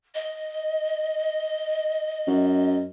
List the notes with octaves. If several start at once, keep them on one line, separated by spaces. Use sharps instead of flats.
D#5
F#2